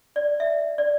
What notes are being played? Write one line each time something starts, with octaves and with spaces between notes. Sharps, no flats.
D5
E5
D5